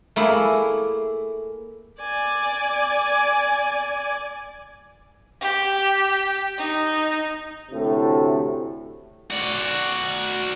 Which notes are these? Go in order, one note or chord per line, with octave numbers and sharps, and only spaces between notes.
A3 A#3 E4 G#4
D5 G#5
G4
D#4
D2 A2 C3 A3
F#4 D5